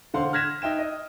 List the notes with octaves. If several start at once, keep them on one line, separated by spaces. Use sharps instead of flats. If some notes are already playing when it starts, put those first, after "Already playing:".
E1 D3 C5 F5 F#5 C6
F6 F#6 G#6 A#6 B6 E7
D#4 E5 G5 E7
D#5